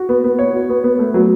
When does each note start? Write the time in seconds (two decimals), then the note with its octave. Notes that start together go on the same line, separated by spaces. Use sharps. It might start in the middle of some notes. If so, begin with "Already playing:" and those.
Already playing: F#4
0.09 B3
0.24 B3
0.39 C#5
0.53 F#4
0.69 B3
0.84 B3
0.99 A3
1.14 F#3